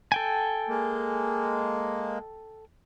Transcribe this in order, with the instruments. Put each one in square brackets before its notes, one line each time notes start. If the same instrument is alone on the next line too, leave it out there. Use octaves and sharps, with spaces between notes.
[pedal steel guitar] A4 G5 G#5
[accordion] G#3 A#3